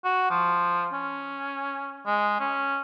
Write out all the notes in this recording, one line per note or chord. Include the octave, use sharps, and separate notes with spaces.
F#4
F3
C#4
G#3
C#4